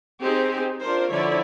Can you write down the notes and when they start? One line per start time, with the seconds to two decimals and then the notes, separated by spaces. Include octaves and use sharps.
0.22 C4 D#4 G4 G#4 C5
0.81 D4 F4 A#4 C5
1.12 D3 F3 E4 C#5 D5